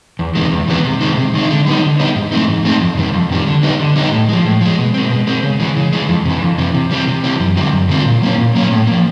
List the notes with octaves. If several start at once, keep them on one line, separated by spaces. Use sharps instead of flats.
E2
C3 D#3 G#3 B3
E2
C3 D#3 G#3 B3
C3
D#3 G#3 C4 D#4
C3
D#3 G#3 C4 D#4
D3
G3 B3 D#4
D3
G3 B3 D#4
G#2
E3 A3 C4 D#4
G#2
E3 A3 C4 D#4
F2
C3 D#3 G3
F2
C3 D#3 G3
D3
G3 B3 D#4
D3
G3 B3 D#4
A2
F3 G#3
A2
F3 G#3
B2
G#3 C4
B2
G#3 C4
C#3
E3 G#3
C#3
E3 G#3
F2
C3 E3
F2
C3 E3
C3
E3 G3 C4
C3
E3 G3 C4
F#2
D3 G3 C4 F4
F#2
D3 G3 C4 F4
A#2
F#3 A#3 C#4
A#2
F#3 A#3 C#4
A2
F3 A#3